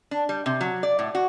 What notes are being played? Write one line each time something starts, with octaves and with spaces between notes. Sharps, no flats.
D4
G3
C3
F#3
D5
A2
F#4